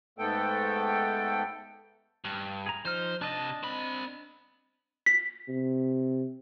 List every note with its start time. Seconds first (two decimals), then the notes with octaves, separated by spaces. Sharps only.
0.19 G#2 A3 B3 A4 G5
2.24 G2
2.66 G#4 A#5
2.85 F3 D#4 C5 F6
3.21 C3 D4 D#5 A5
3.63 C4 B5
5.06 B6
5.48 C3